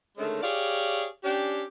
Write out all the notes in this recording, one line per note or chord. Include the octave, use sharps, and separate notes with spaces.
D3 D#3 G#3 A3 C#4
G4 G#4 C#5 D5 F5
C#4 D4 G4